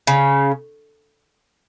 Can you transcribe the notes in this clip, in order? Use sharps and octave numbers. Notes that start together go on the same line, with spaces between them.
C#3